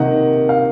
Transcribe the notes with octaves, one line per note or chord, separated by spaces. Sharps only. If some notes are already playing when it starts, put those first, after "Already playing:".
Already playing: C3 D#3 A#3 D#4 F#5
F5